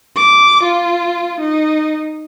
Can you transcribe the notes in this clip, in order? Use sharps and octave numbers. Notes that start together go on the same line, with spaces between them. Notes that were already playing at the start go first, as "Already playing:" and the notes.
D6
F4
D#4